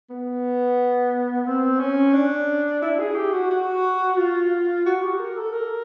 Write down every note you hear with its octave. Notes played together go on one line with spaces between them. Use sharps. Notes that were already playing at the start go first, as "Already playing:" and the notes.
B3
C4
C#4
D4
E4
G#4
G4
F#4
F#4
F4
F#4
G4
A#4
A4
A#4